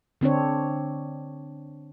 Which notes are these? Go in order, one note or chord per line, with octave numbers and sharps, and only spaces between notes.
D3 C4 D4 C#5